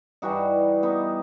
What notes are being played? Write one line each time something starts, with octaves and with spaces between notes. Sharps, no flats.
G2 E3 G3 D#4 F#4
B3 D#4